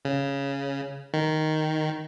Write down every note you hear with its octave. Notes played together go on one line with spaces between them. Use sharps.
C#3
D#3